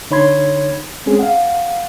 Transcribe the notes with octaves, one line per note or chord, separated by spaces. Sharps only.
D3 D#4 C#5 B5 C6 G#6
G#3 C4 C#4 G#4
F5 F#5